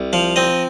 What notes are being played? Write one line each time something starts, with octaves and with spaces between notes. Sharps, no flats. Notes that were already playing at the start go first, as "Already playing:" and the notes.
Already playing: C2
F3 F5
C4 D#5